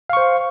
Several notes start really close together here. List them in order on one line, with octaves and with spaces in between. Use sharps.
F5 C#6 C5